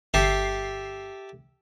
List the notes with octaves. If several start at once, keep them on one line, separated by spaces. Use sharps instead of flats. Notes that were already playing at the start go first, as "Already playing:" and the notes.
G1 G4 A4 E5 C7